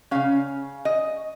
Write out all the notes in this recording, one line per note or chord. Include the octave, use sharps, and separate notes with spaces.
C#3 G#3 C#4 F5
D#5